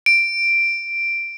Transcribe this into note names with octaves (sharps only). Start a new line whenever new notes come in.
D7